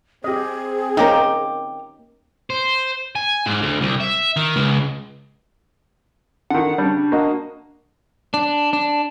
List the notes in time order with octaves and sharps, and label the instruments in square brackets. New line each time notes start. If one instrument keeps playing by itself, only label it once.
[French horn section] C4 [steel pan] G4 D#5 [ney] G#4
[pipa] D#3 G4 A#4 [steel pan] A#3 C#4 D#4
[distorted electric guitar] C5
G#5
G#2
D2
C2
E5
D#3
C#2
[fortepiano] D3 D#3 [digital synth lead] F#5
[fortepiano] C#3 G3 [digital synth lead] D4
[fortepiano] A#3 F#4 D#5
[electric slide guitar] D4
D4